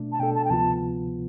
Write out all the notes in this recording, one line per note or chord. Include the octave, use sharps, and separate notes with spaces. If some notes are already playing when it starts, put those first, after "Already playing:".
Already playing: B2 A3 D4
A5
B2 A3 D4 A4 G5
A5
G5
D2 C3 F3 B3 F4 A5